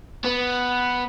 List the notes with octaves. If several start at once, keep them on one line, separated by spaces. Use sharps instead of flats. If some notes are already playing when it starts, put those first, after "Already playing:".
B3